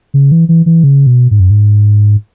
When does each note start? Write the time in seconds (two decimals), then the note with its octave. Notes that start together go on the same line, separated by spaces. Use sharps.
0.14 C#3
0.32 E3
0.49 E3
0.66 E3
0.84 C#3
1.07 B2
1.31 G#2
1.40 F#2
1.51 G#2